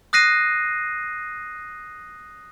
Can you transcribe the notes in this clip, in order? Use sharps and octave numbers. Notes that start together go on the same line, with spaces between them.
D#6 F#6 A#6 C7 D#7